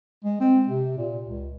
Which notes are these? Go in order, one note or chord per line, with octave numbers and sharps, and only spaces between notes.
G#3
C4
C3
A#2
C#2